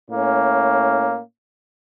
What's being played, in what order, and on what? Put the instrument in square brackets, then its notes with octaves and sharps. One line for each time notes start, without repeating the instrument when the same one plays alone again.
[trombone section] A2 A#3 C#4